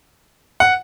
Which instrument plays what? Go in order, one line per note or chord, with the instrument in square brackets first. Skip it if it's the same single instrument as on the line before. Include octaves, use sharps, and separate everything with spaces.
[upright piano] F#5